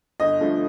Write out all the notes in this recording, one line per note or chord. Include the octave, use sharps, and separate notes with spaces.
G1 D#5
G2 F3 A3